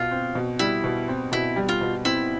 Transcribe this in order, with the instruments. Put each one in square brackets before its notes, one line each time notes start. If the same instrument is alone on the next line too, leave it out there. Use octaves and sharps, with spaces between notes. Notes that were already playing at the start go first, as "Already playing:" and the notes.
Already playing: [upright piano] B2 [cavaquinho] F4
[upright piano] C4
B2
[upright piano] G3 [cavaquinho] E4
[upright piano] B2
C4
[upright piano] B2 [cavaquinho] E4
[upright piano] G3
[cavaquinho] F4
[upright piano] B2
[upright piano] C4 [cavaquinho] E4